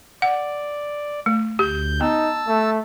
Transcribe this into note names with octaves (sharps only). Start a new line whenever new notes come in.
D5 F#5
A3
D2 G4 G6
B3 D#4 A5 E6
A3